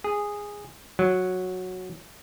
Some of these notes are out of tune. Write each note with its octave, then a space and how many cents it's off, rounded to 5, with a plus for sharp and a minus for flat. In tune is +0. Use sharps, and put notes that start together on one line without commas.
G#4 -10
F#3 -10